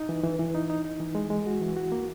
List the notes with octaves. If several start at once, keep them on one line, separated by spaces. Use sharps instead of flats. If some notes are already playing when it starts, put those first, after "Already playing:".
Already playing: D#4
E3
E3
E3
D#4
D#4
D#4
E3
G#3
G#3
F#4
E3
F#4
A#3